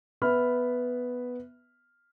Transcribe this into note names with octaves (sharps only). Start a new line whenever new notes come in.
B3 E5 B5 F6